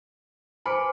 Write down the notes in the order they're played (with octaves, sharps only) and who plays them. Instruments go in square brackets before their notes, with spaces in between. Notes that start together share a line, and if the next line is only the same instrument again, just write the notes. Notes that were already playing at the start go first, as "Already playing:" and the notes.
[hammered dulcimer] B4 C5 [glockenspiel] G#5 D6 D7 [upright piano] B5 F6 C#7